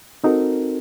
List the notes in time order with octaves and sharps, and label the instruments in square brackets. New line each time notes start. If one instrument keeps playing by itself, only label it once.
[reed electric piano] C4 D#4 F#4 A4 A#4